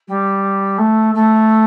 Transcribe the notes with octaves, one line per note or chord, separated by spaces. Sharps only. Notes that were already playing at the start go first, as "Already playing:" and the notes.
G3
A3
A3